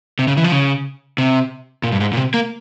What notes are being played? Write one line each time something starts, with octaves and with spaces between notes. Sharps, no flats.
C3
C#3
E3
F3
C#3
C3
A#2
G2
G#2
A#2
C3
A#3